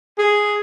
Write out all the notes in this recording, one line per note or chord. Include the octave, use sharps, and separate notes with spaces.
G#4